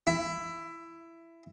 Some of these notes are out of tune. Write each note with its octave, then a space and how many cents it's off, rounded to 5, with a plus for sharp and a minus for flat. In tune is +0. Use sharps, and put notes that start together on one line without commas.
E4 +15